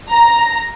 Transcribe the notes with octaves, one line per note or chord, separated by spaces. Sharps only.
A#5